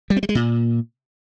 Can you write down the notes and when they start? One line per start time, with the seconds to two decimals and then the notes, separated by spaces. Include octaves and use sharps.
0.10 G3
0.17 C4
0.23 G3
0.29 G#3
0.35 A#2